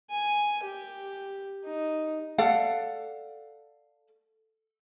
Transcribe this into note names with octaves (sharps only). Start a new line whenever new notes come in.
G#5
G4
D#4
A4 D5 F5 F#5